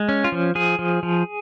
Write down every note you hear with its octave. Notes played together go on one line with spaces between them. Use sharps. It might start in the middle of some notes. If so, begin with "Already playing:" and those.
Already playing: G#3
C#4
F4
F3
F3 G#4
F3
F3